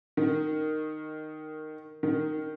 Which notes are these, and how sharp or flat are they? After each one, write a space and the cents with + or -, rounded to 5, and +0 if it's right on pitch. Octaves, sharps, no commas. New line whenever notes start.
D#3 -10
D#3 -10